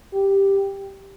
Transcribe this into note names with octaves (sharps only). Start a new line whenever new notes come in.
G4